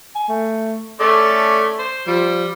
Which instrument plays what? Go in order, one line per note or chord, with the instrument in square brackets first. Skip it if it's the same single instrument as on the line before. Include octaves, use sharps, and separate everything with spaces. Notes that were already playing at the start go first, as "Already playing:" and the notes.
[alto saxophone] G#5
A3
[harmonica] A3 C#4 D5 [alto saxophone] A4
[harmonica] C5
[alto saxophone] F3 [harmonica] G3